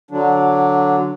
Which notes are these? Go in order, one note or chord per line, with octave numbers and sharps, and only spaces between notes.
D3 F#3 D4